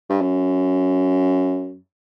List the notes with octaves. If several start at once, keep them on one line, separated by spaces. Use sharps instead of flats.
G2
F#2